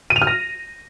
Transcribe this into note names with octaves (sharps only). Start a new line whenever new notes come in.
D#7
F7
F6
A#6